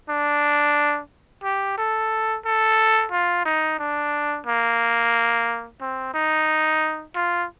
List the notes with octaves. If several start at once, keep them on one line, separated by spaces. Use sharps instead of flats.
D4
G4
A4
A4
F4
D#4
D4
A#3
C4
D#4
F4